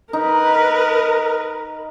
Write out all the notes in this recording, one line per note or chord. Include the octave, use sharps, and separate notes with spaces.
D#4 A#4 B4